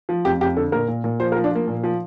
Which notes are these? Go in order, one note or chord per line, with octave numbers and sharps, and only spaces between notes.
F3
F2 G4
F2 G4
D3 A4
A#2 A#4
A#2
A#2
F3 C5
A#4
F3
D4
F3 A#3
A#2
F3